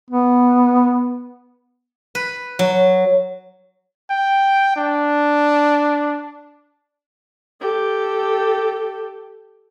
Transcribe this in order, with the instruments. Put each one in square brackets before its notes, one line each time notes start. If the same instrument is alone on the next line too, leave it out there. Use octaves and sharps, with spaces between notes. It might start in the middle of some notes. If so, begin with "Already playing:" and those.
[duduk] B3
[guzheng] B4
F#3
[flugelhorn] G5
D4
[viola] G4 A4